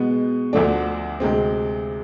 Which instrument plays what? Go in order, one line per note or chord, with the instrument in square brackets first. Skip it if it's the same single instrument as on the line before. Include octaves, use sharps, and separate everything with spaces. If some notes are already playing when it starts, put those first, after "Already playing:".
Already playing: [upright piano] B2 G#3 B3
D2 D3 F3 A3 D4
D2 C3 G#3 C4